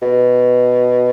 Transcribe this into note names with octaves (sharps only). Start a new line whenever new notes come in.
B2